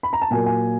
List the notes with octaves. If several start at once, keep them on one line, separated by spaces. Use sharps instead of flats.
B5
A#5
A5
A#2 F#3 A#3 G#5
G#5